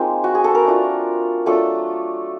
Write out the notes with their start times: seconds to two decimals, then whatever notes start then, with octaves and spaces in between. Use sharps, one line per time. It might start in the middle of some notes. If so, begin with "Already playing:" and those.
Already playing: G#3 A#3 C4 D#4 F4
0.24 F#4
0.35 G#4
0.44 A4
0.55 A#4
0.65 A3 D4 F4
1.46 F#3 A3 D4 F4 A4